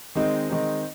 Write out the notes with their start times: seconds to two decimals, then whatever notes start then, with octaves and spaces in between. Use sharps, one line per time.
0.15 D#3 G#3 C4 D#4
0.49 D#3 G#3 C4 D#4